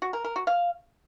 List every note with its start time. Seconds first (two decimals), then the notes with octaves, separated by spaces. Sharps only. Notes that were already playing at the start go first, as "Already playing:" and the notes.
0.02 F#4
0.13 A#4
0.24 A#4
0.36 F#4
0.47 F5